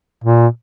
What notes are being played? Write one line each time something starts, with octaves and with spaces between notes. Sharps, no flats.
A#2